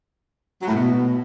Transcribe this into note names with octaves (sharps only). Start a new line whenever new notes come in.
F#3
A2
B2